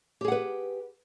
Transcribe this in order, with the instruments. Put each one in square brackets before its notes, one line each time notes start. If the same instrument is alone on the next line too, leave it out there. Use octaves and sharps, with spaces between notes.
[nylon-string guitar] G4
G#4
F#5
B4